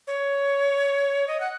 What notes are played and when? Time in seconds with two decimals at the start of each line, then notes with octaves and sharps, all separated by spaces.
0.07 C#5
1.28 D#5
1.40 F#5